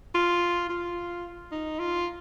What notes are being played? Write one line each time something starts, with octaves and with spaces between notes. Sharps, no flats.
F4
F4
D#4
F4